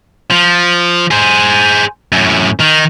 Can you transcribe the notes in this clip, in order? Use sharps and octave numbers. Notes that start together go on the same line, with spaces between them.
F3
G#4 C5
F#2 A2
D#3